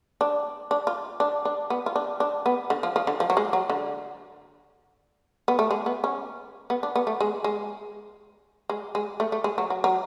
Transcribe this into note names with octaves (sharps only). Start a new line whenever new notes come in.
D4
D4
F4
D4
D4
B3
F4
D4
D4
B3
D3
F3
F3
D3
F3
F#3
G#3
F#3
D3
B3
A3
G#3
B3
C#4
B3
D4
B3
A3
G#3
G#3
G#3
G#3
A3
A3
G#3
F#3
F#3
F#3